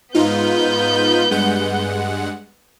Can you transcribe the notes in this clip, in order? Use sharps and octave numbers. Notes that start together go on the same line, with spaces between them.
G#2 B3 D#4 F4 G6
G2 G#3 F#5